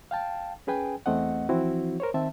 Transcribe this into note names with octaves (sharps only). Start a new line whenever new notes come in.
F5 G5 A5
C#4 G#4 B4 G5 G#5
E2 A3 C4 D#5 F#5
E3 F3 C4 E4 F#4
A#4 C5 C#5
D#3 C4 E5 A5